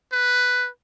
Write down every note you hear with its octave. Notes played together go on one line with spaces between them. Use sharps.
B4